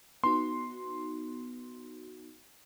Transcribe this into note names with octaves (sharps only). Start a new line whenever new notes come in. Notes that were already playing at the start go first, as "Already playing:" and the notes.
B3 D#4 F#4 C6